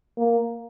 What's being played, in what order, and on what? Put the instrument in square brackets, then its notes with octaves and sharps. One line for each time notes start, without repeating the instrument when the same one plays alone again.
[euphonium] A#3